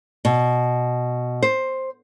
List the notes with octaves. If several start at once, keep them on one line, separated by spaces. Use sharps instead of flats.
B2
C5